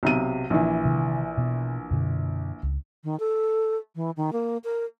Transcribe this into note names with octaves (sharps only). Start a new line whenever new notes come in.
B1 C3 D#7
A#1 E3
C3 D#3
B2 B3
F#2 B2 D3
C#2
D#3
A4
E3
D#3
A#3
A#4